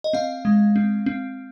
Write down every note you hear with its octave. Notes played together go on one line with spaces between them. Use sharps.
D#5
C4 F5
G#3
C4
C4